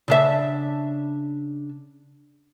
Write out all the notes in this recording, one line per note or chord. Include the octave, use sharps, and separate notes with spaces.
C#3 D4 E5